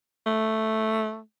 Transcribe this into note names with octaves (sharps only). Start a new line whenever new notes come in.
A3